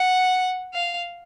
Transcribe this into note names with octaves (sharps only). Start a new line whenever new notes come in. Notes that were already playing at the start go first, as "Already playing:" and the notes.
Already playing: F#5
F5